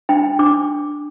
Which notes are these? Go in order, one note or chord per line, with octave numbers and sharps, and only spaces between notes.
D4 G5
D4 D6